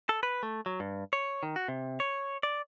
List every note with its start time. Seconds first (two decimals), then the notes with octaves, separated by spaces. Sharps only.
0.09 A4
0.23 B4
0.43 A3
0.66 F#3
0.80 G2
1.13 C#5
1.43 D#3
1.56 F#4
1.68 C3
2.00 C#5
2.43 D5